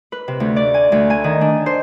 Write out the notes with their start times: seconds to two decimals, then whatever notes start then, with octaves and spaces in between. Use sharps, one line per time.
0.12 B4
0.28 C3
0.40 D2
0.56 D5
0.74 G#5
0.92 D2
1.10 G#5
1.24 D#3
1.41 D4
1.66 C5